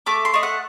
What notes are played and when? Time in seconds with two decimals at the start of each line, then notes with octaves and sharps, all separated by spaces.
0.06 A3 D6
0.25 C6
0.34 A3 D#5
0.43 F#5